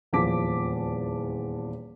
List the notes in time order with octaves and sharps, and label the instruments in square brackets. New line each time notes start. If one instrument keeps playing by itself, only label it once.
[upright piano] D#1 E2 F3 A5 D6 B6